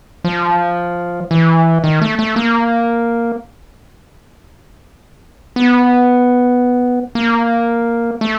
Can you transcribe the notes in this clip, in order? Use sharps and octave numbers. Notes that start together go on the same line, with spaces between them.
F3
E3
D#3
A3
A3
A#3
B3
A#3
A3